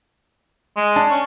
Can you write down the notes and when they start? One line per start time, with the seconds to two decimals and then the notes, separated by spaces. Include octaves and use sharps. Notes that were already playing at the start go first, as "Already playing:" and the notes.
0.77 G#3
0.96 D4 A5
1.10 C#4